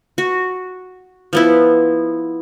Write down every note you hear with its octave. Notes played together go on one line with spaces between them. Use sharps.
F#4
F3 B3 E4